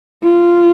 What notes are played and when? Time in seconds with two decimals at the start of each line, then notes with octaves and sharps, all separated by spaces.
0.23 F4